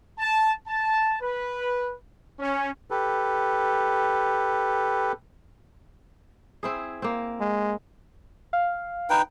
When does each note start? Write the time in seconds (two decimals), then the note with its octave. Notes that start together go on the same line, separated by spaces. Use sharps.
0.18 A5
0.67 A5
1.21 B4
2.39 C#4
2.91 G4 A4 B4
6.63 C4 E4 G#4
7.02 A#3 C4
7.41 G#3
8.53 F5
9.10 D#4 B4 G5